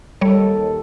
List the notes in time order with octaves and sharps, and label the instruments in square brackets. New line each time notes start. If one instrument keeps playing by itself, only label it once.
[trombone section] D#2 A4 [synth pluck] G3 C#5